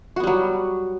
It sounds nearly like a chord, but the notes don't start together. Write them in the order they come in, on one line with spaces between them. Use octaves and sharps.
F#4 B3 G3 F#3